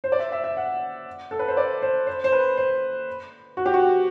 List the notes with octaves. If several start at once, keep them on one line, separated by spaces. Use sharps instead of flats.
C5
D5
E5
E5
E5
F#5
A4
B4
C5
D5
C5
C5
C5
B4
C5
F#4
G4
F#4